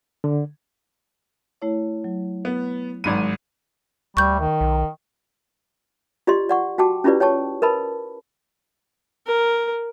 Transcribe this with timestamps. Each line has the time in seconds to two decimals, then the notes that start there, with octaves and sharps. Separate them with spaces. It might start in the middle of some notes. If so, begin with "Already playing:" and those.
0.24 D3
1.62 A3 E4 C#5
2.04 F#3
2.45 B3
3.04 G#1 G#2 F#3 G#3 B5 D#7
4.17 D2 G3 C#6 G6
4.40 D#3
4.61 B1
6.27 F4 G4 D5 D#5 C6
6.49 D5 F#5 C#6
6.78 F#4 G5 A5 D6
7.04 C#4 E4 F4 G4 B4 D5
7.20 C#5 G5 A5 C#6
7.62 A#4 B4 D#5 A5 B5
9.27 A#4